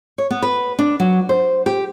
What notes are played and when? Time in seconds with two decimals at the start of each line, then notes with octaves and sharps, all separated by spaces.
0.18 C#5
0.31 B3
0.42 B4
0.79 D4
1.00 F#3
1.29 C5
1.66 G4